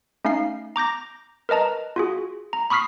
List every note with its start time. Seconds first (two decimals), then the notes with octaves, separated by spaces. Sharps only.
0.25 A3 C#4 D#4 F5 C7
0.76 A#5 D6 G6 A#6
1.49 A#4 B4 D#5 A5 A#5
1.96 F4 F#4 G#4
2.53 A#5
2.70 B5 C#6 D#6 F6 B6 C7